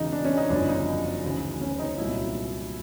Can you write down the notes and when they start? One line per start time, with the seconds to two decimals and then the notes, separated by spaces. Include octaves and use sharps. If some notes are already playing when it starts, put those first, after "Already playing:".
Already playing: E1 E2 C#3 D#4
0.12 D4
0.25 C#4
0.37 D#4
0.50 G1 F#2 C#3 F3 D4
0.68 D#4
1.24 D2 C#3 E3
1.61 C#4
1.79 D#4
1.98 C2 A#2 F#3 E4